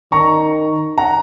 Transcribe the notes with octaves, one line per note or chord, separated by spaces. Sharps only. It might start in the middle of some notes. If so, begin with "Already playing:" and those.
D#3 A#5 C#6
F#5 A#5